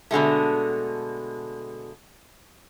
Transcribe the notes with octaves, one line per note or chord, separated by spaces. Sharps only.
B2 D3 G#3 A3